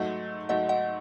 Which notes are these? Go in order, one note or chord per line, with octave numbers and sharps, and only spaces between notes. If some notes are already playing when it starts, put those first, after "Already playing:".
Already playing: G#2 F#3 A3 D#5 F#5
G#2 F#3 A3 D#5 F#5
D#5 F#5